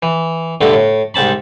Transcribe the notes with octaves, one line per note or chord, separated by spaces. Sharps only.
E3
G2 B2 D3 A3
A2
C2 G#2 C4 A5 B5